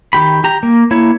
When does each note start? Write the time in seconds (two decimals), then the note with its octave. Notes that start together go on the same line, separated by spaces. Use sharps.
0.13 D#3 G4 B5
0.44 G4 A#5
0.63 A#3
0.91 A#3 E4 C#5